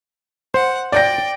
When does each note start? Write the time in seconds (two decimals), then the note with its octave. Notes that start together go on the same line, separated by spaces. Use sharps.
0.54 C5 F#5
0.92 D5 G5 G6 A#6